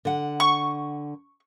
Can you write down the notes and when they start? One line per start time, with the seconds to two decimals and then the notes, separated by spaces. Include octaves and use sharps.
0.05 D3 F#5
0.40 C#6